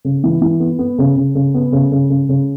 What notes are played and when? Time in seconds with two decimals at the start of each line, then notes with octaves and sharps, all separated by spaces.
0.05 C#3
0.23 E3
0.41 E3
0.60 B3
0.79 B3
0.99 C#3
1.16 C#3
1.35 C#3
1.54 B3
1.72 C#3
1.92 C#3
2.10 C#3
2.29 C#3